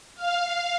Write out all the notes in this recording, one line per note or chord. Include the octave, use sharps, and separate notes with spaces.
F5